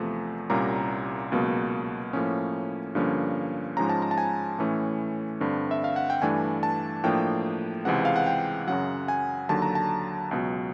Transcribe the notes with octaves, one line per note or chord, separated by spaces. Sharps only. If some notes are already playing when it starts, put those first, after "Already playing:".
Already playing: E2 C3 F3 A3
C2 A#2 G3 A#3 C#4 A#5
C#2 B2 F#3 A#3
A2 F3 A#3 C#4
G2 D3 F3 A#3 C#4
G#2 F3 G#3 C#4 A#5
A5
A#5
A5
G#5
A2 E3 A3 C#4
G2 D3 G3 C4
E5
F5
F#5
G5
G2 E3 A3 D4 G#5
A5
A2 F3 A#3 D4 G5
C#2 C3 E3 G#3 C4 F#5
F5
F#5
G5
F#2 C#3 F#3 F#5
G#5
D#2 D3 F#3 A5
A#5
A5
C#2 B2 F#3